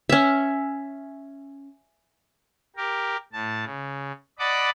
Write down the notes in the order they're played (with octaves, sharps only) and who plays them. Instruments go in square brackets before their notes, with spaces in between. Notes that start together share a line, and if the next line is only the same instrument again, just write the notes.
[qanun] C#4 E5
[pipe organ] G4 A#4
A2 A5
C#3
D5 D#5 F#5 A5 B5 D6